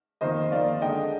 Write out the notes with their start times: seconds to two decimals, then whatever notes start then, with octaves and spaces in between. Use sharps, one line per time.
0.21 F2 D#3 A#3 C5 D#5
0.52 F2 D#3 A#3 D5 F5
0.81 D3 G#3 D4 D#5 G5